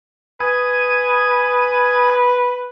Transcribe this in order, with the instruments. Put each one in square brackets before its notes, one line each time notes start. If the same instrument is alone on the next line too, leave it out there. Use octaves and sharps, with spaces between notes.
[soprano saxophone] B4 [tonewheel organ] G#5 D#6